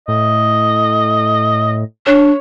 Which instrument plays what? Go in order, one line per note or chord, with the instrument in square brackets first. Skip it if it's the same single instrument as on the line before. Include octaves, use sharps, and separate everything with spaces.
[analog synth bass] A2 [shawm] D#5
[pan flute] D4 [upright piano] C#5